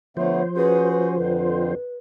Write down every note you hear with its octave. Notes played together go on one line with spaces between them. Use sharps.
D3 F3 A3 B3 C5 C#5
C#4 F#4 G#4 B4
B4
F2 D3 B4